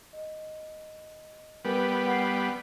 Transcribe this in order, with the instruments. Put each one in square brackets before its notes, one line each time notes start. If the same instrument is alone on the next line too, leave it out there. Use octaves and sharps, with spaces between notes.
[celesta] D#5
[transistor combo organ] G3 B3 [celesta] A#4 B4 G#5
[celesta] F#5 F6 C7